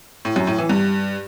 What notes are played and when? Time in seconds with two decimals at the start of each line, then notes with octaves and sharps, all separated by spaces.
0.25 A2
0.36 F#2
0.47 A2
0.58 E3
0.70 G2